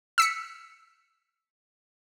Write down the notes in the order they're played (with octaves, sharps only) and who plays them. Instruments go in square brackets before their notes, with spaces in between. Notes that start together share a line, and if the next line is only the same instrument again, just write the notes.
[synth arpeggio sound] E6 B6 C#7